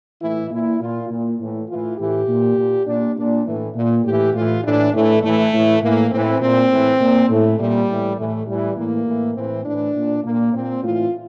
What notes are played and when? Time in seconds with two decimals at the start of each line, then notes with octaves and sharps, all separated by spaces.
0.21 A2 E3 E4
0.50 A#2 E4
0.80 A#2 F4
1.09 A#2
1.39 A2 E3
1.69 A2 E3 F4
1.98 A2 E3 G4
2.28 A#2
2.57 A#2
2.86 A#2 D4
3.16 A#2 D4
3.46 A2 E3
3.75 A#2
4.04 A2 E3 G4
4.34 A2 E3 F4
4.63 A2 E3 D4
4.93 A2 E3 A3
5.23 A2 E3 A3
5.52 A2 E3
5.82 A2 E3 A#3
6.11 A2 E3 C4
6.41 A#2 C4
6.70 A2 E3
7.00 A#2
7.29 A2 E3 A3
7.59 A#2 G3
7.89 A2 E3
8.17 A2 E3 A3
8.47 A2 E3 G3
8.77 A2 E3 A#3
9.06 A2 E3
9.35 A2 E3 C4
9.65 A2 E3 D4
9.95 A#2
10.24 A#2 A#3
10.53 A#2 C4
10.83 A2 E3 F4